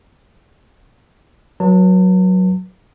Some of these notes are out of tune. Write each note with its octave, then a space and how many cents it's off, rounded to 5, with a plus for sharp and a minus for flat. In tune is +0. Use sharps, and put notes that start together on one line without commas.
F#3 +0 B4 -35 A5 +40